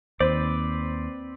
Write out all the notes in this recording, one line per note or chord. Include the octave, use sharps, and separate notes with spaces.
D#2 C4 B4 C5 D5